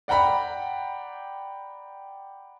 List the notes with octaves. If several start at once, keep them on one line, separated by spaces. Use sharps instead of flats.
D5 F#5 G5 A#5 B5